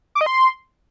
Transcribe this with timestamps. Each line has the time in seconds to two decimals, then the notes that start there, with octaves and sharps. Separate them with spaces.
0.15 D6
0.21 D#5
0.26 C6